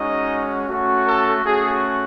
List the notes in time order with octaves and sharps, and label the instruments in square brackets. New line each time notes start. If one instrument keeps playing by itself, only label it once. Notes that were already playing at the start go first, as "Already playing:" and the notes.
Already playing: [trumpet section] G#3 C#4 D#4 F#4 D#5
A3 C#4 F#4
A4
A3 C#4 F#4 G#4